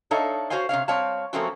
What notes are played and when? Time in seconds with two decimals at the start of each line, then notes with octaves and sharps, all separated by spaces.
0.11 D4 D#4 A4 C#5 E5 F5
0.50 F#4 C5 C#5 F5 G#5
0.69 C3 C#4 C#5 F5
0.88 G3 C4 C#5 F5 A5
1.33 F3 A3 A#3 C4 C#4 F#4